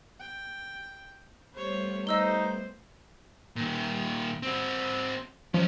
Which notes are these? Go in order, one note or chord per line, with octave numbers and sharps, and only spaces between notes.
G5
G3 A3 B3 C5 C#5
D#4 C5 D#5 E6 G7
A#2 D#3
C4 F#4
F3 C#4 D#4